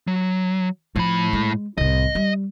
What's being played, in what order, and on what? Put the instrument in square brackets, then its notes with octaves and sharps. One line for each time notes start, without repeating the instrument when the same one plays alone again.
[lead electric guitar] F#3
[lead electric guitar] A2 B5 [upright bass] F3
[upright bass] G#3
[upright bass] C2 A2 [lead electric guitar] D#5
[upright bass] G3